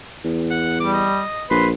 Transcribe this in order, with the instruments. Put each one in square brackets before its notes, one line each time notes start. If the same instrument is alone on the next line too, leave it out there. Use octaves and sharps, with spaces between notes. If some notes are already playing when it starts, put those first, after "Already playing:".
[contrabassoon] E2
[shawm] F#5
[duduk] G3 [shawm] D6
[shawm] D#5
[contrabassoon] A#1 [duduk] B4 [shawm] C6